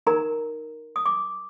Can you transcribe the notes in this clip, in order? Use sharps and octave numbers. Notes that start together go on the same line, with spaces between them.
D#4 A#4 A#5
D#6
D6